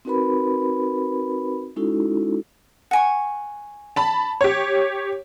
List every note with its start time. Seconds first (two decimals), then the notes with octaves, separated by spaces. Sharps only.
0.05 C4 D#4 F#4 A#4 B4 B5
1.76 G#3 C#4 D#4 E4 F#4 A4
2.91 F#5 G#5 C#6
3.96 A5 B5
4.41 G4 C#5